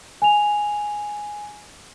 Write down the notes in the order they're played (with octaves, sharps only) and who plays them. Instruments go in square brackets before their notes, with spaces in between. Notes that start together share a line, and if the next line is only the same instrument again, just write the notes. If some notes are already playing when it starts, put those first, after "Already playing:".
[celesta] G#5 F7